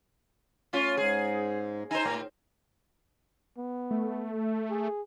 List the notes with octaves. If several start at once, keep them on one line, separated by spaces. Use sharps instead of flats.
A3 C#4 F4
G#2 G#4
D#4 C5 G#5 A#5
A2
B3
A3
G#4